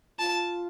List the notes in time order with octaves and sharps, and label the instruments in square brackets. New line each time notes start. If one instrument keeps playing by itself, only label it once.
[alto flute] F4 [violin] A5